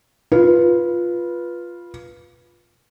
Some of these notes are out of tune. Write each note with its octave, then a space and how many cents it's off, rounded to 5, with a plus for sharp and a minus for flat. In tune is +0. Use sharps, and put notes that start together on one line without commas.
F4 +0 B4 -15